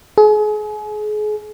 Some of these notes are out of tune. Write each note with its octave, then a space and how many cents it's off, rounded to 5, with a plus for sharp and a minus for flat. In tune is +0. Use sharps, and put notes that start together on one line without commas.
G#4 +35